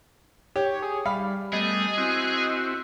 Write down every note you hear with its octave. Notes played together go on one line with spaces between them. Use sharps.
G4 C#5
G#4
G3 F5 B5
G3 A3 B3 G#4 D#5
C4 E4 F#4